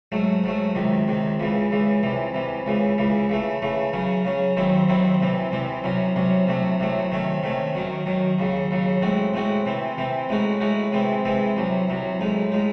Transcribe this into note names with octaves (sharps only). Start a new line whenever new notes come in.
G#2 F#3 A3
G#2 F#3 A3
C#2 C3 D#3
C#2 C3 D#3
C#2 C#3 E3
C#2 C#3 E3
C2 C3 E3
C2 C3 E3
C#2 C#3 E3
C#2 C#3 E3
C#3 E3 A3
C#3 E3 A3
C#3 F#3 C#4
C#3 F#3 C#4
D#2 D#3 F#3 C4 E4
D#2 D#3 F#3 C4 E4
C2 C3 E3 C4
C2 C3 E3 C4
C2 C3 F#3 C#4
C2 C3 F#3 C#4
C2 C3 F#3 A3
C2 C3 F#3 A3
C3 D#3 A3 C#4
C3 D#3 A3 C#4
F#2 D#3 F#3
F#2 D#3 F#3
D#2 C#3 F#3
D#2 C#3 F#3
A2 G#3 C4 F#4
A2 G#3 C4 F#4
C3 E3 C4
C3 E3 C4
A2 G#3 D#4 F#4
A2 G#3 D#4 F#4
C3 E3 G#3 C4
C3 E3 G#3 C4
C2 C3 F#3
C2 C3 F#3
A1 A2 G#3 D#4
A2 G#3 D#4